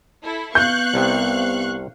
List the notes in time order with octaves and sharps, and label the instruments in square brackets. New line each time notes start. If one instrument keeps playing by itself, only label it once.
[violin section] E4 A4
[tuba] B3 [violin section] F5 C#6 F#6 [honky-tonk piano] G6
[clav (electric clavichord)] C2 C3